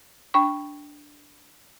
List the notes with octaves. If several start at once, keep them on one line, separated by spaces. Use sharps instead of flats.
D4 G5 C#6